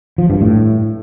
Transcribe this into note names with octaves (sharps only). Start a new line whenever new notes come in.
F3
G2
A2